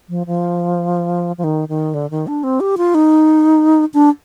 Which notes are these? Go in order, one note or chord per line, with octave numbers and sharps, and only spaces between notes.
F3
F3
F3
D#3
D#3
D3
D#3
D4
C4
G4
F4
D#4
D4